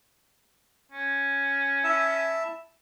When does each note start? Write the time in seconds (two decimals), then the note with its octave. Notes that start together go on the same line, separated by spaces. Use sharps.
0.92 C#4
1.84 E4 E5 A5